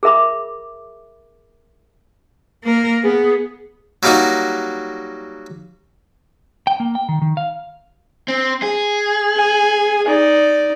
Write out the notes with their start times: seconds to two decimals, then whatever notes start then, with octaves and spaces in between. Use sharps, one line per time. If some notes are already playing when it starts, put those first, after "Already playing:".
0.03 G#4 A#4 E5 B5 D6
2.64 A#3 A#4
3.03 B3 G#4
4.03 F#3 G3 A#3 D#4 F#4
6.67 G5
6.80 A#3
6.95 G5
7.09 D#3
7.22 D#3
7.37 F5
8.28 C4
8.62 G#4
9.35 G#5
10.05 D#4 D5